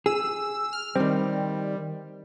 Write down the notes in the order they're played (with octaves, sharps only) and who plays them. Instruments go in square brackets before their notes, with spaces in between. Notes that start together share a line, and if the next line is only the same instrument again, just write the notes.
[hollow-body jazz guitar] G#4 [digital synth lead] E6
[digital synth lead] F6
[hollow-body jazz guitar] D#3 C4 [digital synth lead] G3